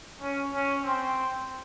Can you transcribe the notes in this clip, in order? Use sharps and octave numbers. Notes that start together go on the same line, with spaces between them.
C#4
C#4
C4